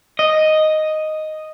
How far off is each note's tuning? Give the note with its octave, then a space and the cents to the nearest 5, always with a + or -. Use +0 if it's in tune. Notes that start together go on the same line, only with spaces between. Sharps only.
D#5 +0